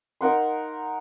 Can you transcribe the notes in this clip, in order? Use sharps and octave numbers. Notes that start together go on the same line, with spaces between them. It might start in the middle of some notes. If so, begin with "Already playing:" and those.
D#4 A#4 F#5 C6